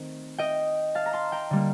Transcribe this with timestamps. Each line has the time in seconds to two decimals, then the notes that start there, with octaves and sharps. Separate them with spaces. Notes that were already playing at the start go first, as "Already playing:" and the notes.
Already playing: D#3 A3 C4
0.38 D#5 G5
0.95 F5 A5
1.06 A#5
1.13 A5 C6
1.32 G5 A#5
1.50 D3 G3 A#3